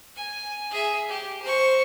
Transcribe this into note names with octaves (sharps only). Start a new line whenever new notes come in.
G#5
G#4 E5
G4
C5 C#6